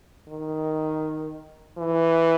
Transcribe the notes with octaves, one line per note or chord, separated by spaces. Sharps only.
D#3
E3